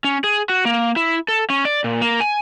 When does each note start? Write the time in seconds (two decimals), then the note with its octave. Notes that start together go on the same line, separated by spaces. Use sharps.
0.04 C#4
0.24 G#4
0.49 F#4
0.65 A#3
0.96 E4
1.28 A4
1.50 C#4
1.65 D5
1.84 A#2
2.01 A#3
2.21 G#5